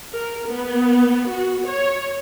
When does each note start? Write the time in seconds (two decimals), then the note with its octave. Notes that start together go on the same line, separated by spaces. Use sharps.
0.14 A#4
0.47 B3
1.29 F#4
1.66 C#5